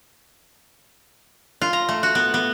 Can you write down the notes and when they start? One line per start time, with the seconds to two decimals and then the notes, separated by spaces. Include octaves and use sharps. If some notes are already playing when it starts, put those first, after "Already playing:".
1.62 F4
1.73 A#5
1.89 A3
2.03 F#4
2.15 B3
2.34 B3